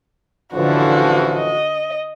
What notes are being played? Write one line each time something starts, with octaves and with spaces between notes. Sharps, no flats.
A1 D3 E3 F3 F#4
D#5